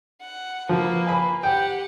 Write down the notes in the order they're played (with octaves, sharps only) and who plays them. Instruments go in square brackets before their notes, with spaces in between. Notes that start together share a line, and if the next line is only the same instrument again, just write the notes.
[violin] F#5
[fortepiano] F3 [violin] A#3 B4
[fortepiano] G#5 B5
[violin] G4 F#5 [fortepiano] G5